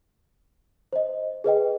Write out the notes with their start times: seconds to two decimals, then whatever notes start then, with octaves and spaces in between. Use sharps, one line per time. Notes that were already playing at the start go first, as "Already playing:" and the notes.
0.93 C5 D#5
1.44 G#4 B4 D#5 G5